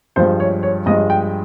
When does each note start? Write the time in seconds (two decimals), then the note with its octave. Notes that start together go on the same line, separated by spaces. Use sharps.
0.16 G2 F3 G#3 C5
0.40 C#5
0.63 C#5
0.86 G2 F3 G#3 D#5
1.10 G5